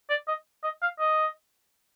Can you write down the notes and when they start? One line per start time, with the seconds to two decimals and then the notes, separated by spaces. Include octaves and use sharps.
0.10 D5
0.28 D#5
0.64 D#5
0.82 F5
0.99 D#5